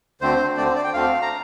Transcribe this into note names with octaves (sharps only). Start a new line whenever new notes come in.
D2 D3 A3 C4 C5
D2 D3 A3 C4 D5
C5
D5
G5
D2 D3 A3 C4 F5
A#5